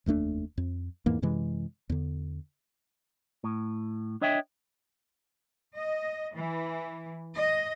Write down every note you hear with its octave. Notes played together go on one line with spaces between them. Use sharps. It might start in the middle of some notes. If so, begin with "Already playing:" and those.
F1 D#2 A3 D4
F2
E2 G#2 E3 A#3
F#2 C3 E3 G#3
E2 D3
A2
D4 C#5 D#5 E5 G5
D#5
E3
D#5